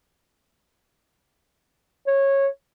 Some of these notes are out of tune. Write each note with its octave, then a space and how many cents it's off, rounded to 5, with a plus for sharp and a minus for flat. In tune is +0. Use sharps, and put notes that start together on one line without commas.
C#5 -15